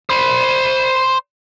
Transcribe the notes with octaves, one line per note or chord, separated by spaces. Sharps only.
C5 B5